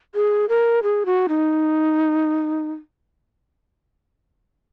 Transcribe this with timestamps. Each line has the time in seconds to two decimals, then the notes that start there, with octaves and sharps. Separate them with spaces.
0.15 G#4
0.49 A#4
0.83 G#4
1.06 F#4
1.29 D#4